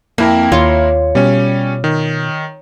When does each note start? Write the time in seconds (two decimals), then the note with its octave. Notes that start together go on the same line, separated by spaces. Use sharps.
0.18 F2 A#3 E4 A#4
0.52 D#2 F4 C#5
1.15 B2 G3 C#4
1.84 D#3